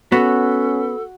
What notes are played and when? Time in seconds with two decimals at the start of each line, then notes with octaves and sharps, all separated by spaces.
0.12 B3 C#4 F#4 A4